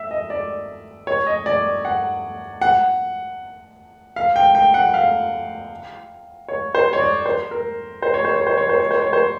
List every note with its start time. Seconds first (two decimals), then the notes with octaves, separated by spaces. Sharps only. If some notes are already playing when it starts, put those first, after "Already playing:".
Already playing: E5
0.11 D#5
0.30 D5
1.07 C#5
1.27 D#5
1.46 D5
1.85 F#5
2.61 F#5
4.16 F5
4.36 G5
4.55 G5
4.74 F#5
4.94 F5
6.48 C#5
6.75 C5
6.93 C#5
7.00 D5
7.26 C5
7.51 A#4
8.02 C5
8.14 C#5
8.25 C5
8.36 C#5
8.47 C5
8.58 C#5
8.69 C5
8.80 C#5
8.91 C5
9.02 C#5
9.13 C5